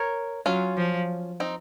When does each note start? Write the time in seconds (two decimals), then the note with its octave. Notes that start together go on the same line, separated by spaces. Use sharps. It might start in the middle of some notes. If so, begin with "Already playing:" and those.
Already playing: A#4 C#5
0.46 F#3 C#4 F4
0.77 F3
1.40 C4 D#4